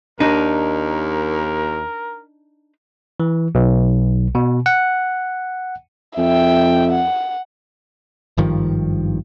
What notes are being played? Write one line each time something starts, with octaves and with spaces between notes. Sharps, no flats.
D#2 D4 D#4 A#4
E3
B1
B2
F#5
F2 E5 G5
F#5
G#1 G2 D#3 F3